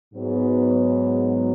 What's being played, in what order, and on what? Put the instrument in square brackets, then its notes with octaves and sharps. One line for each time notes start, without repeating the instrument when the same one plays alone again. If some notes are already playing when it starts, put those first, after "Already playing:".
[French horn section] G#2 F#3 B3